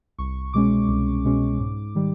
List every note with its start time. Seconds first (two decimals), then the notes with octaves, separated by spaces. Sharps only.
0.19 C2 C#6
0.53 B2 G#3 C#4 D6
0.88 C2
1.25 B2 G#3 C#4
1.59 G#2
1.95 D#3 G3